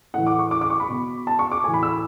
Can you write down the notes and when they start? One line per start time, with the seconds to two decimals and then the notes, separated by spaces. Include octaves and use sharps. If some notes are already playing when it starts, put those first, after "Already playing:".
0.14 A2 E3 F#5
0.27 D6
0.39 C#6
0.51 D6
0.61 D6
0.70 C#6
0.80 B5
0.89 B2
1.27 A5
1.39 C#6
1.52 D6
1.64 A2 E3 G#5
1.74 B5
1.83 E6